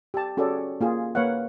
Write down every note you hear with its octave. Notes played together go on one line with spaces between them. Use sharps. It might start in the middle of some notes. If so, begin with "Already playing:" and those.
G4 A5
C#4 F#4 G#4 A4 C#5 D5
A#3 F4 G#4
A#3 B4 C#5 F5 F#5